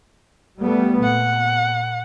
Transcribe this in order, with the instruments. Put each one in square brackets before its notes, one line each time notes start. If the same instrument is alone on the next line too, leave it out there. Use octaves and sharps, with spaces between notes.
[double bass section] G3 A3 B3
[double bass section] A#2 [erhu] F#5